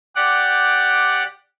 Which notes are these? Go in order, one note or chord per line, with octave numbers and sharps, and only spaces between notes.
G4 D5 F#5 F#6